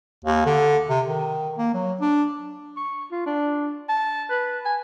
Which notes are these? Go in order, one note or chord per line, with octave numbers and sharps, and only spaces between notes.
D#2
D3
C3
D#3
A#3
F#3
D4
C#6
F4
D4
A5
B4
G#5